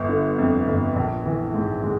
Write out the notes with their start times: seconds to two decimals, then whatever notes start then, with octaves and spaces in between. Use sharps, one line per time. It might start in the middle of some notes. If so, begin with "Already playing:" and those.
Already playing: G1
0.09 D3
0.38 F2
0.67 G1
0.95 A#1
1.26 E3
1.54 G#2
1.84 G#3